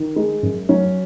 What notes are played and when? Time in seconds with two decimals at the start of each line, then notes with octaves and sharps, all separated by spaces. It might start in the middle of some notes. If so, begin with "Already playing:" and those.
Already playing: D#3
0.16 G#3
0.43 F#2
0.69 F#3 C#4